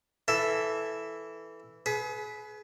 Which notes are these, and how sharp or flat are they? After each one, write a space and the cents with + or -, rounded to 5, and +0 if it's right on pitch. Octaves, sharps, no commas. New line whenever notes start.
E3 +0 E4 +0 A4 +0
G#4 +35 B4 +0